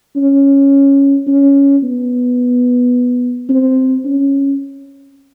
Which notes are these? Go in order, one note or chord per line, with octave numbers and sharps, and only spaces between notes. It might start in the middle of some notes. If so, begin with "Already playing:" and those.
C#4
C#4
B3
C4
C#4